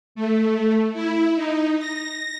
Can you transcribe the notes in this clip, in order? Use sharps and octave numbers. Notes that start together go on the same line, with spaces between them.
A3
E4
D#4
A#6